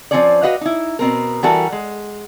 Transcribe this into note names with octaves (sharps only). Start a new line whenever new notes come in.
F3 G#3 C4 C#4 C#5 D5
F#4 B4 D#5 F5
D#4 E4
B2 C4 A#4
E3 G3 F#4 A4 A#4
G#3